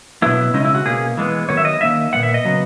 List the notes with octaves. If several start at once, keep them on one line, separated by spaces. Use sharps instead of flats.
B2 F#3 B3 E4
C#3 G#3 C#4 D#4
E4
F#4
B2 A#3 C#4 G#4
E3 G#3 B3
D#3 F#3 B3 C#5
E5
D#5
D#3 A#3 C#4 E5
A#2 G#3 B3 F#5
E5
D#5
C#3 F#3 B3